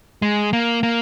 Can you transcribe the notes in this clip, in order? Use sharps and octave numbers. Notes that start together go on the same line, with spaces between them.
G#3
A#3
A#3